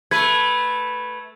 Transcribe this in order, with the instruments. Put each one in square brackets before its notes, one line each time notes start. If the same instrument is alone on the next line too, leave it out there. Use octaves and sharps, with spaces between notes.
[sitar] A3 B4 [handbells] G#6